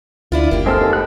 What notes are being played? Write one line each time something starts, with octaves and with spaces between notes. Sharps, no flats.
D2 D4 E4 F4
F#1 A#3 G4
G#3 C4 A4 F6
D#2
A3 B3 F#6